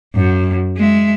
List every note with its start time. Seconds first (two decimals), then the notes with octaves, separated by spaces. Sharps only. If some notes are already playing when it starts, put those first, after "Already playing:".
0.15 F#2
0.77 G#3 E5